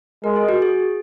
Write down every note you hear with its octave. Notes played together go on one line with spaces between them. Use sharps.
G#3 A#4
G#4
F#4
G#4